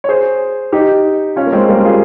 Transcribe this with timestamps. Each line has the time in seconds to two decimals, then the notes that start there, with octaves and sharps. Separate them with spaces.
0.04 C#5
0.09 G#4 C5
0.72 D#4 G4
1.36 C#4 F4
1.46 A#3
1.53 G#3 C4
1.69 G3 A#3
1.85 F4 G#4